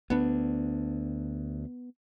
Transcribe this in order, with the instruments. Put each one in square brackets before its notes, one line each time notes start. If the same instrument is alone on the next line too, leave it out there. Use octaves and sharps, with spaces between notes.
[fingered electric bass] D2 D4 [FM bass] B3